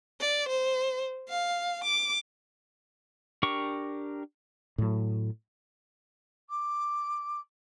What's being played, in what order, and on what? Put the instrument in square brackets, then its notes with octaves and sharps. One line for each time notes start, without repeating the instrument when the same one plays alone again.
[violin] D5
C5
F5
D6
[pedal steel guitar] D4 G4 A#4 C#6
[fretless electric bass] A2 F#3
[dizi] D6